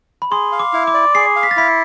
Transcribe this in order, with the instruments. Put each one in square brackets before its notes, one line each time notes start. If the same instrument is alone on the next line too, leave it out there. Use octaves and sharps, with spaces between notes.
[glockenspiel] B5
[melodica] G#4 [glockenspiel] C6
[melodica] F5
[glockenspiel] D6
[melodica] E4
[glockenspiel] D6
[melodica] D5
[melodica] G#4 [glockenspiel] C7
[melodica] F5
[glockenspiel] B6
A6
[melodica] E4 [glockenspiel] B6